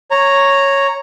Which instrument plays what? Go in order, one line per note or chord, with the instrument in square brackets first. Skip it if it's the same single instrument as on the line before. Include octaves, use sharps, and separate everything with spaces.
[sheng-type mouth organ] C#5 A#5